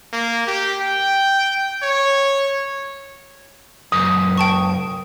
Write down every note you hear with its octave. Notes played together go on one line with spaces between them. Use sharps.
A#3
G4
G5
C#5
C#2 F#2 D#6
G5 A5 C#6